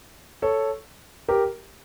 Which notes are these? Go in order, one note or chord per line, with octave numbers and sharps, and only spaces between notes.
A4 C#5
G4 A#4